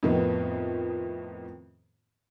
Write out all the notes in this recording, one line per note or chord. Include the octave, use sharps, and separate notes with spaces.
F2 A2 D#3 F3 B3